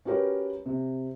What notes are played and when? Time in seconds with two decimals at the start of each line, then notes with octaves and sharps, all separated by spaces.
0.05 C#4 F#4 G4 A#4 B4
0.66 C3